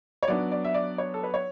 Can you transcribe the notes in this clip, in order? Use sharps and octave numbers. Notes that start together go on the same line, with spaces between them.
C#5
F#3 B3 D4 D5
D5
E5
D5
C#5
A4
B4
C#5